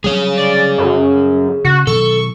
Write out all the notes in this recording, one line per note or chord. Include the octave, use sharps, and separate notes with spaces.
F#3 G3 G#4 C#5
D5
F#2
C#3 F#4
B2 D#3 F#3 A4 C#6